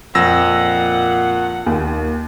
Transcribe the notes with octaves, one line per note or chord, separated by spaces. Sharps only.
F2 A#2 F#5 E6 A#6
D#2